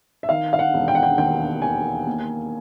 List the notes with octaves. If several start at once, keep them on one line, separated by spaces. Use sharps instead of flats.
E5
D#3 F5
F5
F#5
E1
G5
F#5
G5
D#2 G5
D#2 G#5
A#3